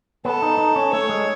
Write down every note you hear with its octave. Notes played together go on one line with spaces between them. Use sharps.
B3 A4
D#4
D#4
C#4
A3 C#5
G#3